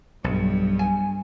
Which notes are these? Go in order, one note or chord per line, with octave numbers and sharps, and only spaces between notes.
B1 G2
G#5